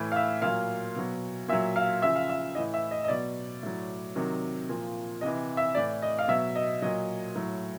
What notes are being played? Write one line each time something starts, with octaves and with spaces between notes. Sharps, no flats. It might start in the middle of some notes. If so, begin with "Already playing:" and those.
Already playing: A2 E3
F5
E5
A#2 F#3 F5
B2 F#3
A#2 F#3 E5
F5
C#3 F3 E5
F5
E5
A2 E3 D#5
E5
D#5
D#5
B2 F#3 D5
A2 F#3
C3 D#3 F#3
A#2 F3
C3 E3 D#5
E5
A2 E3 D5
D#5
F5
B2 F#3 E5
D#5
A#2 F#3 D#5
A2 F#3